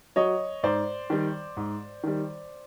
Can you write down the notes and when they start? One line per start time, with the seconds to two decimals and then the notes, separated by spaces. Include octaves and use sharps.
0.16 F#3 C#5 D#5
0.63 G#2 C5 D5
1.10 D#3 G3
1.57 G#2
2.03 D#3 G3